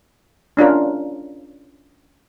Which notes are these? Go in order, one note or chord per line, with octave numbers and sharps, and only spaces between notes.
C#4 D4 F4 A#4